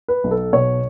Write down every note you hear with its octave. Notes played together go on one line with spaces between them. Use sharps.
B4
B1
A4
B2 C#5